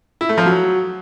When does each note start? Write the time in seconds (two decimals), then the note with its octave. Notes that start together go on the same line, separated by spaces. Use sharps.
0.21 E4
0.29 A3
0.38 F3
0.46 F#3